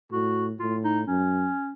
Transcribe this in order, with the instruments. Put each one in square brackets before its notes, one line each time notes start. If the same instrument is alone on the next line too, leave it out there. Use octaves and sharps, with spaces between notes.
[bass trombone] A2 [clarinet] F#4
[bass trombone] A2 [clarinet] F4
[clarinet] D#4
[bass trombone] F#2 [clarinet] C#4